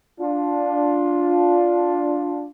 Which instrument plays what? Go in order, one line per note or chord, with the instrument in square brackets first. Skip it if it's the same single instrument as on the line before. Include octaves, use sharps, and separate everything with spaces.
[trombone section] D4 F4